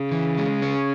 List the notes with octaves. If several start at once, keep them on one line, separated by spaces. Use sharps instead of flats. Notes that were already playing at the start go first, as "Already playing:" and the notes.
Already playing: C#3
E3
G#3
C#4